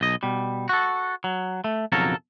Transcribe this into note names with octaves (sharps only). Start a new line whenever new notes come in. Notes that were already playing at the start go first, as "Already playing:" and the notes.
B1 D#5
B2 G3
F#4 A4
F#3
A3
B1 F2 C#3 F#3 A4 A#4